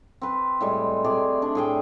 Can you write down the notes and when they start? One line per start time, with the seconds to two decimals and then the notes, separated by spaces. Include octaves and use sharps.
0.21 C4 B4
0.61 A2 G3 G#3
1.04 C3 A3 G#4 D5
1.42 D4
1.55 A2 G#4 G5